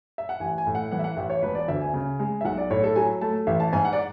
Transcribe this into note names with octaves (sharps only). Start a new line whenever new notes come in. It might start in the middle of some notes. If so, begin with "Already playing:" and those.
E5
F#5
A1 G#5
G#5
A2
F#5
E3 F#5
E5
F#5
A1 E5
C#5
E1 B4
D5
D2 E5
G#5
C#3
G#3
E5
B1 F#5
D5
A2 C#5
A4
F#3 G#5
A3 A5
A1 E5
A5
G#2 G#5
F#5
D5